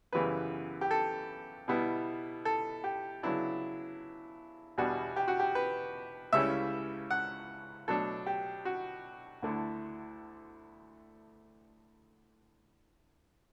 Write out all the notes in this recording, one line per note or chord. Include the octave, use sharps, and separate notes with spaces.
F#2 C#3 E3 G3 B3 B4
G4
A4
B2 G3 B3 E4
A4
G4
C#3 F#3 B3 D4 E4
E2 B2 G3 D4 F#4
G4
F#4
G4
B4
C#2 C#3 G3 C#4 E4 E5
F#5
B2 F#3 A3 D4 A4
G4
F#4
D2 D3 A3 E4